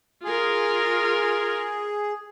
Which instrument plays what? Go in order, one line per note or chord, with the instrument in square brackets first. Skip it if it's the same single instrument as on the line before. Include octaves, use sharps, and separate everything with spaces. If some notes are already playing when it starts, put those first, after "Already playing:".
[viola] F4 A#4 [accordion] G#4